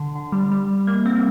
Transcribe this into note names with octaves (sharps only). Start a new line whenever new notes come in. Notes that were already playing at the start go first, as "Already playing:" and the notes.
Already playing: D3
D3
G3
G3
A#3
C4